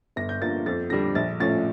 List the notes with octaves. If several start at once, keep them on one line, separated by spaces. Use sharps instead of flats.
G1 A#6
G6
G2 F3 A#3 A6
F2 A6
D3 G3 D4 A#6
A#1 A6
A2 F3 C#4 A6